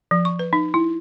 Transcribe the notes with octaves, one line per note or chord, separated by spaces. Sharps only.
F3
C#6
B4
D#4
E4